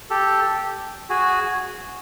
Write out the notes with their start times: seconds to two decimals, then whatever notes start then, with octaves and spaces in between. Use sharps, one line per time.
0.10 G4 A4
1.10 F#4 G#4